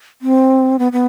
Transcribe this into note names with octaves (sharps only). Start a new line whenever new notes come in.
C4
B3
B3